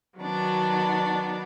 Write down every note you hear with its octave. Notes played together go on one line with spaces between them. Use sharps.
D#3 F#3 B3 D4